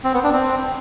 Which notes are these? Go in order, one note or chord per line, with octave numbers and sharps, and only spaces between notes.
C4
B3
D4
C4